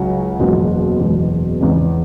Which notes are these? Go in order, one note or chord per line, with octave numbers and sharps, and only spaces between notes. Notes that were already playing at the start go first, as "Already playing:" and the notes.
Already playing: C#2 C#3 F#3 C#4 F#4
F#1 E2 B2 G#3
F#1 E2 B2 G#3
E2 C#3 G#3